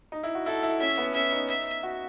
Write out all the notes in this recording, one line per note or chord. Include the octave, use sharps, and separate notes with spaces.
D#4
E4
F#4
E4 A4
E4
C#4 E5
B3
C#4 E5
D#4
E5
F#4